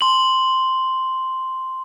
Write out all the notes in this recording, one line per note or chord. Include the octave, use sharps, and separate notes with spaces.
C6 F#7